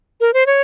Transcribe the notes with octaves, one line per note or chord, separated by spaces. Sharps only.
A#4
C5
C#5